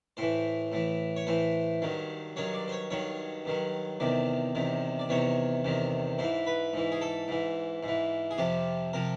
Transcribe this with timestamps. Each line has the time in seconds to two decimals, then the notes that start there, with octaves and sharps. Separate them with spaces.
0.17 A2 E3 C5
0.72 A2 E3
1.16 C#5
1.27 A2 E3 C5
1.82 G2 D#3 F#3
2.36 G2 D#3 F#3 C#5
2.54 D5
2.68 C5
2.72 C#5
2.90 G2 D#3 F#3 C#5
3.45 G2 D#3 F#3
4.00 E2 C3 D#3 D5
4.55 E2 C3 D#3
4.99 D5
5.09 E2 C3 D#3 C#5
5.64 E2 C3 D#3
6.18 G#2 E3 C5
6.47 B4
6.73 G#2 E3
6.92 G#4
7.01 A4
7.28 G#2 E3
7.83 G#2
7.88 E3
8.31 G#4
8.38 F2 C3 F3 G4
8.93 C3 F3 A#4